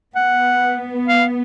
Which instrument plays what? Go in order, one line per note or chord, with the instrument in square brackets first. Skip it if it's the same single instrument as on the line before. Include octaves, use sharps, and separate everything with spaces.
[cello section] B3 [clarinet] F#5
[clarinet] F5